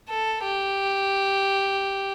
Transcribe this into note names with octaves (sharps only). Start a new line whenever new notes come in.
A4
G4